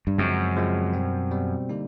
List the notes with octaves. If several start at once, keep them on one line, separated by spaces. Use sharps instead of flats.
G2
F#2 C#3 F3 G#3 C4
C#3 F3 G#3 C4
B2 G3 C4
B2 G3 C4
D3 G3 A#3 D#4